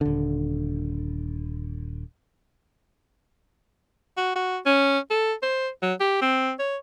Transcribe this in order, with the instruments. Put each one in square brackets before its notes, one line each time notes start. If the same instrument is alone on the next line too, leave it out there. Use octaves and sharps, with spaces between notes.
[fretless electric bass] D#1 D3
[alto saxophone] F#4
F#4
C#4
A4
C5
F#3
G4
C4
C#5